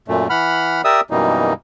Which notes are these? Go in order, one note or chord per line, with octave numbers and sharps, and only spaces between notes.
F#2 A#2 A3
E3 F#5 B5 F6
G4 A#4 D5 E5 D#6 E6
F#2 B2 E3 G3 A#3 D#4